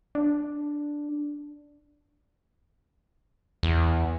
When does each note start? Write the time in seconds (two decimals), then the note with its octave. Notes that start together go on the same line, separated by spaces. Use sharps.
0.15 D4
3.63 E2